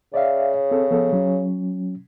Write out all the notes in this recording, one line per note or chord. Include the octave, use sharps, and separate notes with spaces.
C#3 D5 E5 F5
C4 A4
F3 B3 A4
F#3 C#4